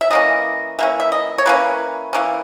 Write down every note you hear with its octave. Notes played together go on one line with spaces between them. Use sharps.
E5
E3 A#3 C#4 D#5
E3 A#3 C#4 E5
E5
D#5
C#5
E3 A#3 C#4 B4
E3 A#3 C#4